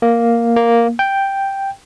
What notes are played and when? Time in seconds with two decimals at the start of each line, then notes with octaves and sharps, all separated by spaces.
0.02 A#3
0.56 A#3
0.99 G5